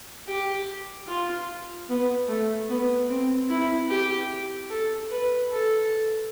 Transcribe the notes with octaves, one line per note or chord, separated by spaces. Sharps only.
G4
F4
B3
A3
B3
C4
E4
G4
A4
B4
A4